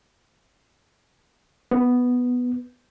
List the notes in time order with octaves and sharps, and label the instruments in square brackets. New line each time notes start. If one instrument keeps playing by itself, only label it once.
[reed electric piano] B3